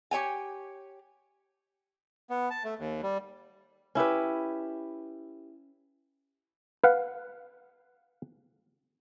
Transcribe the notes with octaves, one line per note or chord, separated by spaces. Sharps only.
G4 C#5 G5 G#5
B3
A5
A3
D#2
G3
C#4 E4 G4 B4
B4 F5 F#5